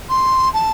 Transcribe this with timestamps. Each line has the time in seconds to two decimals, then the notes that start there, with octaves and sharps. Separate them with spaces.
0.09 C6
0.53 A5